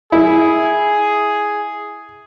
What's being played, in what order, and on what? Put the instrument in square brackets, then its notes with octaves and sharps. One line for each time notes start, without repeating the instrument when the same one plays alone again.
[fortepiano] E4 [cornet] G#4